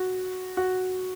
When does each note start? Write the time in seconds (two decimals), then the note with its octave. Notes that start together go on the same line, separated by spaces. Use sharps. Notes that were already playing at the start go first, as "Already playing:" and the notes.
Already playing: F#4
0.57 F#4